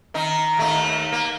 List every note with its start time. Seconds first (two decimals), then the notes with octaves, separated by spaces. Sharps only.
0.14 D#3 D#4
0.57 D#2 A3 D#4
1.12 A#3